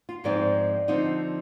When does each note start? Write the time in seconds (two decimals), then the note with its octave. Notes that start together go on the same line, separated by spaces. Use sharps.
0.09 F4
0.24 G#2 F3 C4 D#4 D5
0.88 D3 F3 C4 D#4